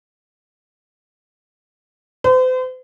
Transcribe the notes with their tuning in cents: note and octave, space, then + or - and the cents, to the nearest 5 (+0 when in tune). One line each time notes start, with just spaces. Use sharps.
C5 -40